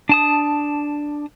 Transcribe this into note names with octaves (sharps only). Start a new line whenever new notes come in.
D4 A5 D#6